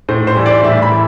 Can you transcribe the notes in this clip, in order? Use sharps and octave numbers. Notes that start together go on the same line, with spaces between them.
A2 C5
C5
E3 G3
D5
A2 E5
B5
E3